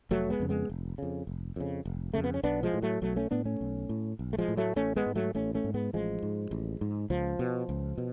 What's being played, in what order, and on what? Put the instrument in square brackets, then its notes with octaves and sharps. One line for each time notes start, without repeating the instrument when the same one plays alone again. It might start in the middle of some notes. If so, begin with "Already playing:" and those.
[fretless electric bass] F1 F#3 A3
G#3 B3
F2 C#3
G#3 B3
F1
F2 C#3
F1
F2 C#3
F1
F2 C#3 A3
B3
C#4
B1 B3 D4
F3 G#3
A2
F#3 A3
B1 F#3 A3
A3 C#4
A2 B3 D4
A3 C#4
B1
A2
B1
A3
F3 G#3
A2
F#3 A3
A1 A3 C#4
G#3 B3
G#2
F#3 A3
A1 A3 C#4
A3 C#4
G#2
G#3 B3
A1 F3 G#3
G#2
A1
G#2
C#2 F3
B2
C#2
B2